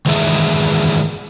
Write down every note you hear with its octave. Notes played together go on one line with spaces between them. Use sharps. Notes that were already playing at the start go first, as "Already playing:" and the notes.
D#3 E3 G#3 G#4 E5